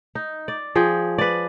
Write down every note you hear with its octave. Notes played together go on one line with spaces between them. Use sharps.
D#4
D5
F3 G#4 G5
B4 D5